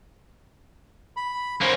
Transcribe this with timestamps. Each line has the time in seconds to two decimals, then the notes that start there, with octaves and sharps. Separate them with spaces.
1.17 B5
1.62 A#3 C#4 C5